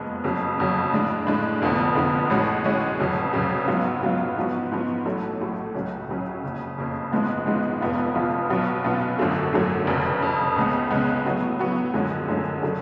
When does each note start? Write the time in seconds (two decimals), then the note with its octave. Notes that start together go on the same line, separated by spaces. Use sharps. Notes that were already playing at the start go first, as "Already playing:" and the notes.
Already playing: F#1 F2 F3 G#3 B3
0.24 F#1 F2 C#3 F#3
0.58 F#1 F2 C#3 F#3
0.93 A2 G#3 D4
1.27 A2 G#3 D4
1.62 F1 F2 D3 F3 B3
1.95 F1 F2 D3 F3 B3
2.30 A1 A2 G#3 C#4 F#4
2.64 A1 A2 G#3 C#4 F#4
3.00 F1 F2 C#3 F#3
3.33 F1 F2 C#3 F#3
3.67 G#2 F#3 B3 F4
4.02 G#2 F#3 B3 F4
4.37 G#2 F3 B3 F#4
4.71 G#2 F3 B3 F#4
5.05 A1 A2 F#3 A3
5.40 A1 A2 F#3 A3
5.74 C#2 C#3 F#3 C#4
6.09 C#2 C#3 F#3 C#4
6.44 F#1 F2 C#3
6.78 F#1 F2 C#3
7.12 G#1 G#2 F3 G#3 B3
7.46 G#1 G#2 F3 G#3 B3
7.81 F1 F2 F3 B3 F4
8.15 F1 F2 F3 B3 F4
8.50 B1 B2 F#3 B3 F4
8.84 B1 B2 F#3 B3 F4
9.19 G#1 F#2 D3 F#3 A3
9.53 G#1 F#2 D3 F#3 A3
9.87 F1 F2 C#3
10.21 F1 F2 C#3
10.56 C#2 C#3 G#3 B3
10.90 C#2 C#3 G#3 B3
11.25 A2 F#3 B3 F#4
11.59 A2 F#3 B3 F#4
11.94 F#2 D3 F3 G#3 C#4
12.28 F#2 D3 F3 G#3 C#4
12.62 C#3 F#3 A3 D4